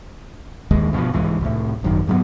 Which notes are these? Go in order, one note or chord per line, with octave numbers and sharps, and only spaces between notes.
A#1 D#2 D#3 G#3
G2 B2 E3 F3
C2 G#2 E3
C2 A2
G#1 F#2 D#3
G#2 F#3 G#3 B3